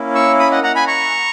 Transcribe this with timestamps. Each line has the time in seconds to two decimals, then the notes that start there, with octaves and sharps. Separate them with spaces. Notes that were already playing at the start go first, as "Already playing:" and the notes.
Already playing: A#3 C#4 E4
0.15 C#6 E6
0.39 B5 D#6
0.51 D#5 F#5
0.63 F#5 A#5
0.75 G#5 B5
0.87 A#5 C#6